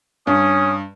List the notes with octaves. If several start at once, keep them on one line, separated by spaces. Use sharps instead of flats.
G2 C#4 D#6